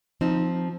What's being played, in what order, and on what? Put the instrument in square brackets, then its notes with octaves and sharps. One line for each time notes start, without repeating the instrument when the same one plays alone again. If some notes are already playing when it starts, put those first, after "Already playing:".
[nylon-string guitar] F3 C4 D#4